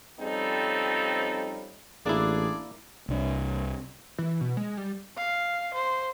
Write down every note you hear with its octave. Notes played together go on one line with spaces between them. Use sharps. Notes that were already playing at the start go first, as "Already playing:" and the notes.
F3 G3 C4 C#4 D#4 A4
A1 A#3 D4 E4 G#4 D5
C2 D4
E3
B2
G#3
G3
F5
C5